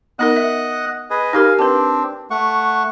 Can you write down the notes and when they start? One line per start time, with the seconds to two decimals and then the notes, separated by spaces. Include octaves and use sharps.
0.19 B3 D#4 A#4 D#5 F#5 F#6
0.36 E5
1.10 G#4 B4 D#5
1.33 D#4 G4 A#4 F5 G#5
1.59 C4 D4 B4 A5
2.31 A3 F#5 C#6